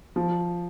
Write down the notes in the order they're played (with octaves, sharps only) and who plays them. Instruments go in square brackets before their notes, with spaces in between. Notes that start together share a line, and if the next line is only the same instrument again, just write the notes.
[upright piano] F3